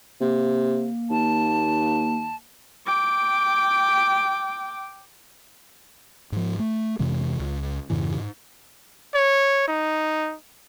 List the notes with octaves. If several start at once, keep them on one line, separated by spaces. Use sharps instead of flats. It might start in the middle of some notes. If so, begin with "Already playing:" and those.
C3 A#3
D#2 A5
G5 D6
G#2 F3
A3
F2 C3 E3 G#3
C#2
F2 G#2 C#3 E3
G#2
C#5
D#4